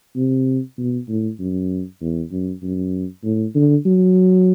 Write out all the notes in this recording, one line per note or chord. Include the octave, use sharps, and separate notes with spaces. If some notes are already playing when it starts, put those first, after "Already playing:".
C3
B2
A2
F#2
E2
F#2
F#2
A2
D3
F#3